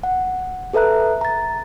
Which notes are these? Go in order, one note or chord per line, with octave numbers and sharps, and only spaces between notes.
F#5
G#4 A4 B4 E5 A#5 F#6
A#5 A6